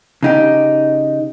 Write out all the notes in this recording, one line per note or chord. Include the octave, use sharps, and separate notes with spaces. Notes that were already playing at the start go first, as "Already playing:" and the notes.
C#3 D#4 G4